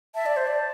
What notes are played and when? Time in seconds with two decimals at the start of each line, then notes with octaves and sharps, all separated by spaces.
0.15 E5 A5
0.26 D5
0.36 C5
0.47 D5